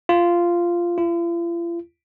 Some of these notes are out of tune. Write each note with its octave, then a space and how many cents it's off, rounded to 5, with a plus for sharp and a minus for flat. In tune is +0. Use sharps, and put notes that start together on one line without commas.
F4 -10
F4 -45